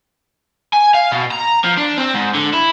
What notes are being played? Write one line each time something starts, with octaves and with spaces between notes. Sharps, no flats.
G#5
F5
B2
A#5
F3
D4
C4
G#2
D3
E4